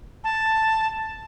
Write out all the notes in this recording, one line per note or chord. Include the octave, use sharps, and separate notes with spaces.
A5